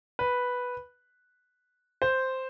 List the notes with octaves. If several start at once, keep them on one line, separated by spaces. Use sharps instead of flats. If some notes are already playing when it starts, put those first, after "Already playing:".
B4
C5